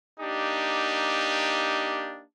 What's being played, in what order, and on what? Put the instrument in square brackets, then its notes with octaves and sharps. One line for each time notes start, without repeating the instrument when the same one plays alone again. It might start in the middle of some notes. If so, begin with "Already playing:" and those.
[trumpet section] A#3 D4 D#4 G4